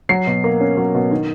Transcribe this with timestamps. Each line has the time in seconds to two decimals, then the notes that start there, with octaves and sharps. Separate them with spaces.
0.09 F#3 C7
0.27 B2
0.44 A#3
0.60 C#4
0.77 F#3
0.95 B2
1.11 D#3